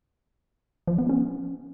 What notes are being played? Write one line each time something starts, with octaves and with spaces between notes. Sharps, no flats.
F3
B3
C#4